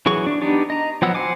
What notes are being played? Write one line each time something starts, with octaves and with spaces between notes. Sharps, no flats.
E3 F#3 G#4 C#6
D4
B3 D4 D#4 G4 D5
D#5 A#5
F3 F#3 B3 F#5 E6
C5 F#5 G#5 D6